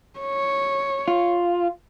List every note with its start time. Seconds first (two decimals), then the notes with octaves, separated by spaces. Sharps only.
0.19 C#5
1.08 F4